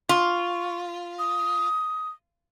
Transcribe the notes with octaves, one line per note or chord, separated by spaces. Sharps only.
F4 C#6
D#6